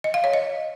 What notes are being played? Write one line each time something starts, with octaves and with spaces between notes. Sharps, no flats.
D#5
F5
C#5
D#5